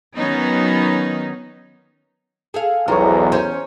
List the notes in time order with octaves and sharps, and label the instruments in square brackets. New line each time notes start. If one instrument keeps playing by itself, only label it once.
[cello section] D#3 F#3 B3 C#4 D#4
[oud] G#4 A4 F5
[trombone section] B1 E2 [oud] F3 G3 G#3 [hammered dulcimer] C#5 A#5
[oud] C#4 C5